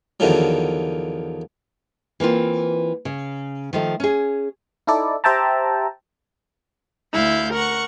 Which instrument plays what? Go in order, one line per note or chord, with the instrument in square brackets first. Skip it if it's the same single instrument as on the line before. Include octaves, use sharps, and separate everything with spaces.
[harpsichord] E2 D3 D#3 F3 F#3
[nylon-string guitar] E3 A#3 C4 F4
C#3
D#3 F3 A3
C#4 G#4
[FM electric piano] D#4 E4 A4 D5
G4 C5 E5 G5 A5 A#5
[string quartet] D2 E4 F5 G6
A#4 F#5 C#6